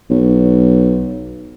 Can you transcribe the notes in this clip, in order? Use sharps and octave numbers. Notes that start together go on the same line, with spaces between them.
B1